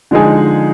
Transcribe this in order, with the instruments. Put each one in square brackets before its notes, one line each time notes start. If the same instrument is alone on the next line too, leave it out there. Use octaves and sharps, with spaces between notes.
[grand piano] D3 F3 G#3 D#4 G#4